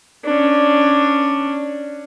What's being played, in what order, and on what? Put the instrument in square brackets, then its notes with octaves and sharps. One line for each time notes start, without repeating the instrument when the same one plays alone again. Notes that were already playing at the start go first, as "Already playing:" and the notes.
[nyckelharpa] C#4 D4